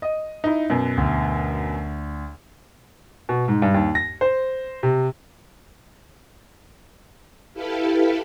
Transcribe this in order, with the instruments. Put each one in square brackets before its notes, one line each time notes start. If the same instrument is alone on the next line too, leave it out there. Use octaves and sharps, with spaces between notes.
[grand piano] D#5
[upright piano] D#4 E4
F#2 B2
[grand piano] D2
B2
G#2
G2
D#2
A#6
C5
C3
[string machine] E4 G4 A4 B4 F5